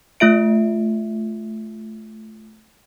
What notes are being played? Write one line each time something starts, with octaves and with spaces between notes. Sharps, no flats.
A3 F4 E5 D7